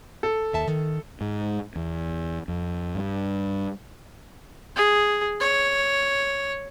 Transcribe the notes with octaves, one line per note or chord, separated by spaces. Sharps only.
A4
D#2 E5 A5
D#3
G#2
E2
F2
G2
G#4
C#5